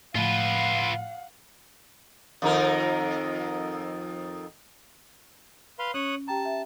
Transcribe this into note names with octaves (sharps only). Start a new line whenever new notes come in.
A2 F3 F4 B4 F5 F#5
F2 D#3 A#4
B4 F5 C6
C#4 C#5 D#6 F#6
G4 G5 A5 A#5
E5